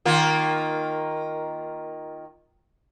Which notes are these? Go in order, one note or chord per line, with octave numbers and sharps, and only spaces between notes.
D#3 A#3 F4